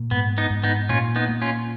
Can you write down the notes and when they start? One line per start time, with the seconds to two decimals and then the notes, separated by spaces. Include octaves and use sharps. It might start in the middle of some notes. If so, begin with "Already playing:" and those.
Already playing: A#2
0.11 G#2 B3
0.38 B3 D#4
0.50 G#2
0.64 B3 D#4
0.89 A#2 C#4 F4
1.16 B3 D#4
1.29 A#3
1.42 C#4 F4